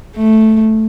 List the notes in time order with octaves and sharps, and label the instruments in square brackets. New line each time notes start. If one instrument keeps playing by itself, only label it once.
[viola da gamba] A3